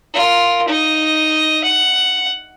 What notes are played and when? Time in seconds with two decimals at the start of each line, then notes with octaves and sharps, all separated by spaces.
0.14 F4 A#4
0.68 D#4 D#5
1.64 F#5